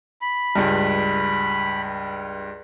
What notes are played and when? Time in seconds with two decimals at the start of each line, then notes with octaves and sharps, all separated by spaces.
0.22 B5
0.55 C#2 G2